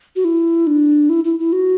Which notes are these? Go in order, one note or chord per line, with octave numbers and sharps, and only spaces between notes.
F#4
E4
D4
E4
E4
E4
F#4